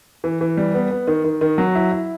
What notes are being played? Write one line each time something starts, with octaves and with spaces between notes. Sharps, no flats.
E3
E3
G3
B3
B3
D#3
D#3
D#3
F#3
E4
E4